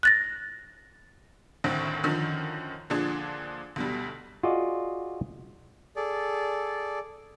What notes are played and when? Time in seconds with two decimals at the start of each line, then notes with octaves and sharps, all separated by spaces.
0.03 F#6 A6 A#6
1.64 F#1 D2 A2 D3 D#3 C4
2.03 F#2 D3 D#3 F3
2.90 A#2 D3 F3 D4 G#4
3.76 D2 B2 G3
4.43 F4 F#4 G#4 D5 D#5
5.96 G#4 A4 D5